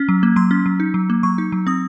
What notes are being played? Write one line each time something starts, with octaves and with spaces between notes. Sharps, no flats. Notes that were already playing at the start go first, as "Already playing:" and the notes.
Already playing: C#4
F#3
A#3
F#3 C6
C#4
F#3
D#4
F#3
A#3
F#3 C#6
D#4
F#3
C4 D#6